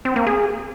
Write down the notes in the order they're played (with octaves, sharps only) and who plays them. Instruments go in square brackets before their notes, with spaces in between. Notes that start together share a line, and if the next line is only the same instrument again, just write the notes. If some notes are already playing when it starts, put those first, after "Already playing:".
[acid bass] C4
A#3
G#4